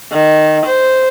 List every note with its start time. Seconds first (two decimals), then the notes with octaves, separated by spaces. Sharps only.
0.13 D#3
0.66 C5